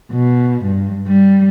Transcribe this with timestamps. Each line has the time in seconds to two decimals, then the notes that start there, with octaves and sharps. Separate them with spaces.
0.12 B2
0.65 G2
1.07 G3